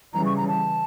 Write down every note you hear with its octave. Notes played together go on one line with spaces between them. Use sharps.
C#3 E3 G3 A#5
C#6
A#5
A5